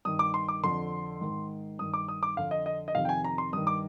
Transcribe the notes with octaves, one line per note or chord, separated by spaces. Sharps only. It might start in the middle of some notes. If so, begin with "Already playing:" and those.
G2 D#3 D#6
D6
C6
D6
F2 D3 C6
G#2 D#3
G2 D#3 D#6
D6
D#6
D6
F2 D3 F5
D#5
D#5
D#5
F2 C3 D#3 F5
G5
G#5
A#5
C6
G2 D#3 D#6
D6